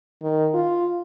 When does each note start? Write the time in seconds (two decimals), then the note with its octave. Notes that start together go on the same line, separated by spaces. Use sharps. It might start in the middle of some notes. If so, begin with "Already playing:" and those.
0.22 D#3
0.54 F4